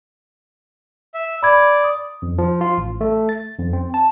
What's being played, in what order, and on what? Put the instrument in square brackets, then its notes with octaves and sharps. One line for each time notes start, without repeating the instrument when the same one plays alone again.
[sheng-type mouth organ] E5
[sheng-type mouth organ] D5 [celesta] B5 G#6
[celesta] D#6
[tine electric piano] F2
F3
F4
A1
A3
A6
F2
C4
A5